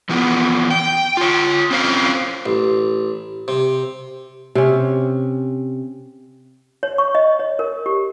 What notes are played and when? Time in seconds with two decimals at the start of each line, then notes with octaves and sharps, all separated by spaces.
0.09 E3 F3 B3
0.70 G5
1.17 F4 C#5
1.71 C4 C#4 F4 C5 F5
2.46 A1
3.48 C3
4.55 C3 C#4
6.83 C#5
6.98 C#6
7.15 D#5
7.39 C#5
7.59 A#4
7.86 G4